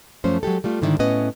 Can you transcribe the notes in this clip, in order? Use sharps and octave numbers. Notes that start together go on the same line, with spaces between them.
F#2 F3 A3 C#4 C5
F#3 G#3 G4 A4
G3 A3 F4
G#2 D3 D#3 D4 E4
A2 B3 C#4 B4 D#5